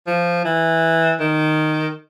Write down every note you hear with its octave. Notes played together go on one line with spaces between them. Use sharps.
F3
E3
D#3